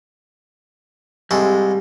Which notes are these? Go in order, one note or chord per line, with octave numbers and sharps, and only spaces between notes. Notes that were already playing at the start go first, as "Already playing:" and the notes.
C2 G3 G#3 A4